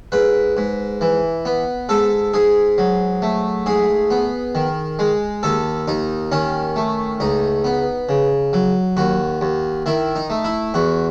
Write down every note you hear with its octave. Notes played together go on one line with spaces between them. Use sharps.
G#2 B4
G#2
E3
B3
G#2 A4
G#2 G#4
F#3
A3
G#2 G#4
B3
D#3
G#3
D#2 A4
D#2 D#4
D#3 C#4
A3
C#2 D#4
B3
C#3
F#3
D#2 F#4
D#2
D#3 E4
D#4
A3
E4
E2 F#4